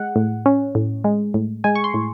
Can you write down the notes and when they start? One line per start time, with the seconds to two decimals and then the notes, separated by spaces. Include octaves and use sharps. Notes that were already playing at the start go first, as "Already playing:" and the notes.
Already playing: G#3 F#5
0.16 A2
0.46 C#4
0.75 A2
1.04 G#3
1.34 A2
1.64 G#3 G#5
1.75 C#6
1.84 C6
1.94 A2